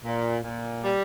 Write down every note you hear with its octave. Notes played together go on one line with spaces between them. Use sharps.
A#2
A#2
G3